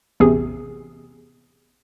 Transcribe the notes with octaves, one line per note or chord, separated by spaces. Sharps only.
A1 E2 C3 G#4